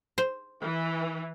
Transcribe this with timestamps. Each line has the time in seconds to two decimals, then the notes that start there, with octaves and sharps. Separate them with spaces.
0.18 C5
0.62 E3